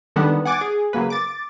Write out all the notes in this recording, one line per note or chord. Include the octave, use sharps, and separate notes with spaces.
D3 D#3 G3 B3 D4
F#5 G#5 D6 A6
G#4
C#3 F#3 A#3 B4
D6 A6